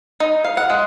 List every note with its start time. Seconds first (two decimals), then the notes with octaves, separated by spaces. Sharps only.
0.20 D#4
0.44 F5
0.57 F#5
0.70 G#3